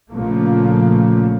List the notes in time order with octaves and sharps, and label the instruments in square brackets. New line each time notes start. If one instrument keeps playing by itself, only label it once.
[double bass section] A#1 A#2 C#3 F3 A3 A#3